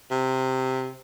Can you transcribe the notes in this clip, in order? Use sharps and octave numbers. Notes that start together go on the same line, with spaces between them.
C3